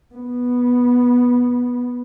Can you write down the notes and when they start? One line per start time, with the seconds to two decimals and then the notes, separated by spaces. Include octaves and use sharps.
0.15 B3